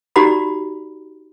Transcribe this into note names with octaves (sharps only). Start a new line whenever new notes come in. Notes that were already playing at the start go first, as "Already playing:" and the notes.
D#4 F#4 G4 D5 A#5 B5